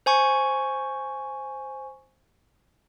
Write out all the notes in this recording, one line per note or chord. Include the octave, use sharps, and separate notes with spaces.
C5 G#5 C#6